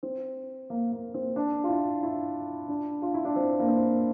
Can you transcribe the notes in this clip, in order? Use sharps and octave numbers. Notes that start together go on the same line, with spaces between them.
C4
A#3
A#3
C4
D4
F4
E4
E4
D4
F4
E4
D4
C4
A#3
C4